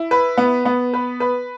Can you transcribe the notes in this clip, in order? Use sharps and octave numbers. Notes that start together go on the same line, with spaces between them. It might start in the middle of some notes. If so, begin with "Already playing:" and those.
Already playing: E4
B4
B3
B3
B4
B4